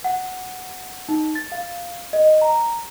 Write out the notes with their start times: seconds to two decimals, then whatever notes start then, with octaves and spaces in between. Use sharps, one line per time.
0.04 F#5
1.09 D#4
1.35 A6
1.52 F5
2.13 D#5
2.42 A#5